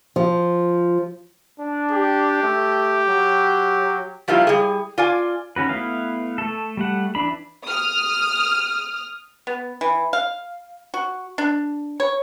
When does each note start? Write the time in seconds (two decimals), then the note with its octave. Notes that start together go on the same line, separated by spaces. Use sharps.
0.16 F3
1.60 D4
1.91 G4
2.43 A3
3.08 F#3
4.28 F3 G3 A#3 E4 F4
4.47 G3 G#4
4.98 F4 D5 G#5
5.56 D#3 C#4 F#4 B4
5.69 A3 B3 E4 F5
6.38 A3 A4
6.77 G3 A3 F#5
7.15 E3 D4 B5
7.65 D#6 F6
9.47 B3
9.81 E3
10.13 F5
10.94 F#4
11.38 D4
12.00 C#5